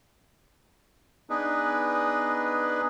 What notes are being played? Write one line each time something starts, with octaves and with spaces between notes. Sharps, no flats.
B3 D4 D#4 G#4 B4 D#5